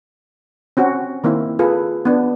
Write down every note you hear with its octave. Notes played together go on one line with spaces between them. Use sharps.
C4 C#4 F#4
D#3 A#3 C4 E4
F4 G#4 A4 B4
B3 D4